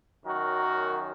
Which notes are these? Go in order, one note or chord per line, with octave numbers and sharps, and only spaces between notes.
F#2 D#3 F#3 F#4 A#4